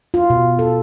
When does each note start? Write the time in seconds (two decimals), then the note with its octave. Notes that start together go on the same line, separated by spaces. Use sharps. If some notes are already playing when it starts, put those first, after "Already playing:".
0.14 F4
0.30 B2
0.59 A4